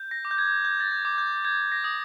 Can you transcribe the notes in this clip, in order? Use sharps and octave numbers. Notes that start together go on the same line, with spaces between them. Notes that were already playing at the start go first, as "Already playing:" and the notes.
Already playing: G6
A#6
D6
G6
G#6
G6
A6
G#6
D6
G6
G6 G#6
A#6
D#6